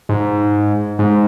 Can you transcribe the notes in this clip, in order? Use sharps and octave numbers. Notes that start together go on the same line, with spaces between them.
G#2
G#2